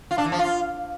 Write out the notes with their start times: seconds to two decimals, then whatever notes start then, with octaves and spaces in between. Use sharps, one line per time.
0.11 F4
0.18 D4
0.25 E3
0.32 F3
0.39 F4